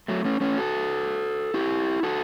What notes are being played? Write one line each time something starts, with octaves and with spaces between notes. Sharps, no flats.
F#3 A3
A3 C#4
A3 C#4
F#4 A4
E4 G4
F#4 A4